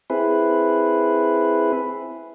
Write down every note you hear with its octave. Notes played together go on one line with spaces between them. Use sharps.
C4 E4 G#4 B4